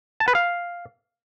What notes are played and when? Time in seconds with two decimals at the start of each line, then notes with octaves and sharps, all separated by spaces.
0.20 A5
0.28 B4
0.35 F5